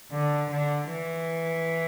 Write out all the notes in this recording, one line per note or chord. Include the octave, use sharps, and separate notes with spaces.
D3
D3
E3